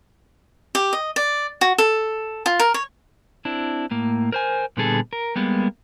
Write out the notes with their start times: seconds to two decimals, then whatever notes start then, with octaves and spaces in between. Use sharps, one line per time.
0.75 G4
0.93 D#5
1.16 D5
1.61 F#4
1.78 A4
2.46 F4
2.59 A#4
2.74 C#5
3.45 C4 D4 E4
3.91 A2 A#3
4.32 A#4 C5 G#5
4.77 A#2 D3 G3 B3 G#4 A4
5.13 A#4
5.36 G3 G#3 A#3 B3